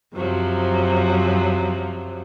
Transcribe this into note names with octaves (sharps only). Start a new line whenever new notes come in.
F#2 C3 F3 F#3